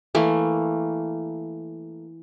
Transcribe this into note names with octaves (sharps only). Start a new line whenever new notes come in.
E3 A3 A#3